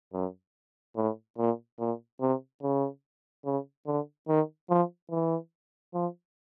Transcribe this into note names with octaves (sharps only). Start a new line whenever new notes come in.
F#2
A2
A#2
A#2
C3
C#3
C#3
D3
D#3
F3
E3
F3